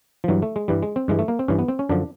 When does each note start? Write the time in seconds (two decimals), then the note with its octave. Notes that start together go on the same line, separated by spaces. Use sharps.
0.24 F3
0.28 G2 E3 F#3
0.42 A3
0.56 G#3
0.68 G2 E3 G3
0.83 G#3
0.96 C4
1.08 G2 E3 G#3
1.19 A3
1.28 A#3
1.39 C4
1.48 G2 E3 C#4
1.59 B3
1.68 C4
1.79 C#4
1.89 F#2 D3 F3 D4